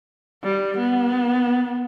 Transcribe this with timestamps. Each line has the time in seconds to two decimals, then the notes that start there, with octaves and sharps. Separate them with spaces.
0.44 G3
0.78 B3